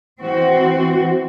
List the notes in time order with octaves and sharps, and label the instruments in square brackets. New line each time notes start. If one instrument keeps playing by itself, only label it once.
[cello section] E3 C4 F#4